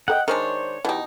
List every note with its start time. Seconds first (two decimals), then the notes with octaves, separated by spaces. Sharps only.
0.08 A4 A#4 D#5 F#5 G5
0.28 D#3 G#3 D4 A#4 C5 C#5
0.85 B2 E3 D#4 G4